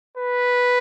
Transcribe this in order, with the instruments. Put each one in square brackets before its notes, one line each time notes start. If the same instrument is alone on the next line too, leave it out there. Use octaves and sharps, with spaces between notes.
[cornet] B4